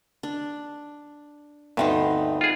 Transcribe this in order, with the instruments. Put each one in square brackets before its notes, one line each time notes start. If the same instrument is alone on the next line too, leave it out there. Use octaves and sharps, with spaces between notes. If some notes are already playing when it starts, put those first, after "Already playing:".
[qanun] D4
[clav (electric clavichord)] D2 G2 [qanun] B3 C4 D#4
[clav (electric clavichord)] F4 G#4